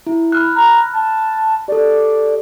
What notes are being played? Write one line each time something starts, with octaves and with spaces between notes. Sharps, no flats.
E4
B5 F6 F#6
A#5
A5
G4 A4 D5